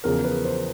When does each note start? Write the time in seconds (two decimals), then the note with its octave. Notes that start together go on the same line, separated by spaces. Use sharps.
0.04 E2 C#3 F3 A#4
0.25 B4
0.45 C5